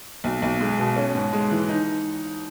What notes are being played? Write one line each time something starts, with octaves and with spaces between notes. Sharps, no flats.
B1
B1
G#3
B2
C#4
G#2
G#3
E3
D#4